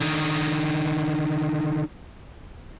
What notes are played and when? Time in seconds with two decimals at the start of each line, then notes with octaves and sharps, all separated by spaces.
0.01 D3 D#3